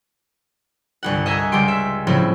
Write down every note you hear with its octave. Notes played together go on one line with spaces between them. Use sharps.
G1 C2 F#5
D#5 E5 G#5 A#5
C#2 G3 G4 C6 D7
E5
A2 C#3 F3 F#3 C4 E4